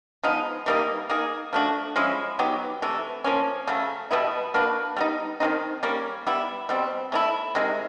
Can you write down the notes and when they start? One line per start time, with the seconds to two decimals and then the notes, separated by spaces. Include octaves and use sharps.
0.23 F3 G#3 B3 D#4
0.66 E3 G3 A#3 D#4
1.10 A#3 D#4 G#4
1.53 F3 A3 D4 F#4
1.96 F3 G#3 C#4 E4
2.39 F#3 B3 D#4 G4
2.82 C3 E3 A3
3.24 F3 A#3 C#4
3.67 C#3 F#3 A3
4.11 B2 G3 B3 E4
4.54 A#3 D4 F#4 B4
4.97 G3 B3 D#4
5.40 D#3 G#3 C4 D#4
5.83 G3 A#3 C#4
6.27 G3 B3 E4
6.69 B2 G3 C4
7.12 A3 C#4 E4
7.55 C3 D#3 G#3